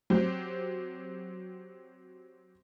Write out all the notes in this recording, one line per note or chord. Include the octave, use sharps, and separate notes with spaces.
F#3 C4 G4